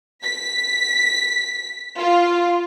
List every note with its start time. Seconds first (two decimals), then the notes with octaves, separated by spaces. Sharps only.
0.22 B6
1.97 F4